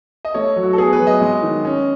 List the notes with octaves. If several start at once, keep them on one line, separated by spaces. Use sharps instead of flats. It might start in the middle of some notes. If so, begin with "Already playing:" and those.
D#5
A3 C#5
F#3
F#4
A4
B3 G#4
B4
F#3
D#5
G#3
D#3
C#4